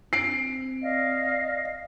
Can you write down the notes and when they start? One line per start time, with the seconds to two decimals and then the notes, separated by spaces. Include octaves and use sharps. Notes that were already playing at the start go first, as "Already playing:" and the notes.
0.13 C4 C7 D7
0.82 D5 D#5 F5